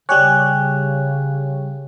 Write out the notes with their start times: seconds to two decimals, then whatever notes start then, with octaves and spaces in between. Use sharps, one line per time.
0.09 C#3 G3 G4 C#5 G#5 F#6